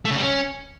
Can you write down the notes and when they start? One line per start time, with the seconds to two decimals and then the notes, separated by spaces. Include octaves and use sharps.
0.05 A3
0.11 C#3
0.16 G3
0.22 C#4